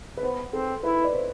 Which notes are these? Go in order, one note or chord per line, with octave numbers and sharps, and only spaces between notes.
B4
B3 C5
C4 A4
E4 B4
D5
C5